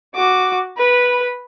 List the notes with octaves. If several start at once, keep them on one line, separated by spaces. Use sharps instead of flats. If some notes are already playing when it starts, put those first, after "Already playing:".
F#4 D6
B4 B5